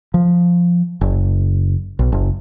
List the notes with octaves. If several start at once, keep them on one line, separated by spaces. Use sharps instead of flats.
F3
F#1
B1
F#1